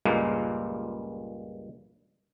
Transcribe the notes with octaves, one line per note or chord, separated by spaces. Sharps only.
C#2 G2 A#2 G#3 A#3